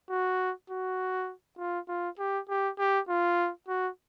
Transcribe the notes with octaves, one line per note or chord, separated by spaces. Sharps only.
F#4
F#4
F4
F4
G4
G4
G4
F4
F#4